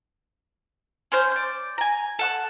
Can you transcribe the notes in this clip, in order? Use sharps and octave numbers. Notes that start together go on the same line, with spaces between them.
C#4 C5 G6
D5 G6
G#5 A#5
A4 F#5 E6